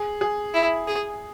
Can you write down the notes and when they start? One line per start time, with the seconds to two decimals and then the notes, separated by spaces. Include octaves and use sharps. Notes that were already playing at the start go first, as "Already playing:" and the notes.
Already playing: G#4
0.21 G#4
0.54 E4
0.87 G#4